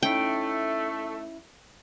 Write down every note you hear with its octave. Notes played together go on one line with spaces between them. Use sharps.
A3 C#4 D#4 E4 G5